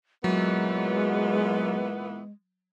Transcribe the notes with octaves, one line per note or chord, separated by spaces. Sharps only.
A#2 E3 F#3 G#3 B3